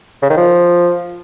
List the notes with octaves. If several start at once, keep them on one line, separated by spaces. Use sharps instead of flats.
C#3
D#3
F3